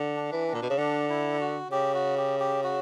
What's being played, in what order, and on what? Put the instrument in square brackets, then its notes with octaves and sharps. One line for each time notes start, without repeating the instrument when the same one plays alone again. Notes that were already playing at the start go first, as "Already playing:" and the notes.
Already playing: [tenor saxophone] D3
[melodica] D4
[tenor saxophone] E3
[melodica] D4
[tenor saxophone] A#2
B2
C#3
[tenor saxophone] D3 [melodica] D4
[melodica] E4
F#4
[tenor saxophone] C#3 [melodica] G4
[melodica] F#4
G4
G4
F#4